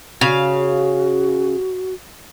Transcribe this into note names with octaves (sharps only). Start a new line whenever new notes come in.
C#3 F#4 F5